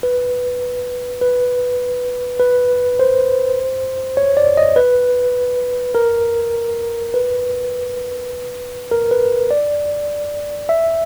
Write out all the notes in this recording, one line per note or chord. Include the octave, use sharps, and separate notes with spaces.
B4
B4
B4
C5
C#5
D5
D#5
B4
A#4
B4
A#4
B4
D5
E5